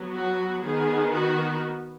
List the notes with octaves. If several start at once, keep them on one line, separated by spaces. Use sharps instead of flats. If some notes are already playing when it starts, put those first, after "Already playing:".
Already playing: F#3 B3
F#4
D#3 B3 G#4
F#4